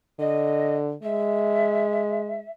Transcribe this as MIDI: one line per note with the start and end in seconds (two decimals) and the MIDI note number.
0.19 0.93 50
0.19 0.75 75
1.03 2.45 56
1.03 2.50 76